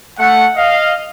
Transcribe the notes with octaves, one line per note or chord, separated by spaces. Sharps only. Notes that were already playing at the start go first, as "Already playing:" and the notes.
A3 F#5
D#5 F5